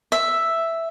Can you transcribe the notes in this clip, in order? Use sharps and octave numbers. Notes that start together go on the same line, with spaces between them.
E5